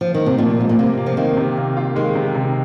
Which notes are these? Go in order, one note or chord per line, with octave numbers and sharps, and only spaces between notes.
F3
D#3
C3
A#2 F3
G#2 F3
A#2
C3 A#3
A#3
F3
D#3 A#3
C3
A#3
F4
D#3 G#3
C3
C3